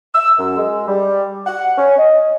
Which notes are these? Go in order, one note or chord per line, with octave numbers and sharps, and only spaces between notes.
E6
F#2
G#3
G3
F#5
C#4
D#5